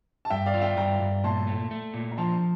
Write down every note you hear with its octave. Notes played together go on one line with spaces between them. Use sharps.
A5
G2 E5 G5
D5 F5
F4
E5 G5
G2 G5 A#5
G2
A#2 A5 C6
A3
A3
A#2
A#5
F3 A5 C6